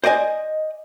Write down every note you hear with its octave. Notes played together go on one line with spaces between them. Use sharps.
C5 D5 D#5 G#5